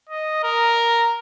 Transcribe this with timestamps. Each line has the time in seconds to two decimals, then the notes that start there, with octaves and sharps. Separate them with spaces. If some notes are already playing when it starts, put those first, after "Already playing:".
0.09 D#5
0.44 A#4